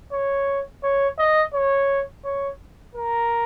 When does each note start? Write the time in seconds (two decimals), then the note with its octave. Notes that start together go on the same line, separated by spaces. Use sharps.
0.12 C#5
0.83 C#5
1.18 D#5
1.53 C#5
2.24 C#5
2.95 A#4